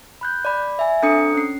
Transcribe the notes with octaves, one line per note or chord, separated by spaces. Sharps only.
B5 F#6 G6
D5 B5
E5 G#5
C4 D4 A4 A#5 D#6 C#7
C#4 C7